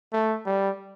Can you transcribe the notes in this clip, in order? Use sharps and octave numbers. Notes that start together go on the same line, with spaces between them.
A3
G3